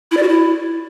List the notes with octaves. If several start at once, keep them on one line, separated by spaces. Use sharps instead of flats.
E4
D5
F#4
E4